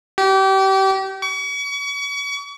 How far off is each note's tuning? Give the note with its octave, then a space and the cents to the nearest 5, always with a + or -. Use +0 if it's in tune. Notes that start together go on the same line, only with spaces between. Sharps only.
G4 -30
C#6 +40